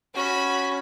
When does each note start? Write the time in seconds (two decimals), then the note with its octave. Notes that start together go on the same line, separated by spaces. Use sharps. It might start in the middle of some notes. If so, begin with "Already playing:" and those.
0.15 C#4 F#4 B5